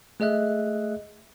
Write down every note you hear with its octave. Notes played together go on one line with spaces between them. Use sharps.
A3 G#4 D#5 E5 F#6